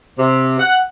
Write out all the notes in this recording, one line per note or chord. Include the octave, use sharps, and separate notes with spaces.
C3
F#5